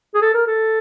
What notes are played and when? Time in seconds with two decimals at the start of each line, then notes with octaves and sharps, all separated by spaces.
0.14 G#4
0.22 A4
0.34 A#4
0.47 A4